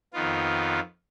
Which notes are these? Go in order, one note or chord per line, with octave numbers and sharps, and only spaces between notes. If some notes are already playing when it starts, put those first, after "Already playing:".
F2 D#3 B3 F4